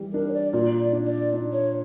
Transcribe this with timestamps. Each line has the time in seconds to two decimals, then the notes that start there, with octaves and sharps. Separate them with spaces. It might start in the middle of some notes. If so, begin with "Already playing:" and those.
Already playing: E3 G3
0.13 D4 A#4
0.29 C#5
0.34 D5
0.53 A#2 D5
0.80 D5
0.93 D4
1.06 D5
1.34 D4
1.53 C#5